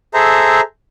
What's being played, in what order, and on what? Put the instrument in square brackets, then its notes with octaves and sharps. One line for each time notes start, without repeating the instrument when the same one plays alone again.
[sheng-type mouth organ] G#4 A4 C5 E5 A#5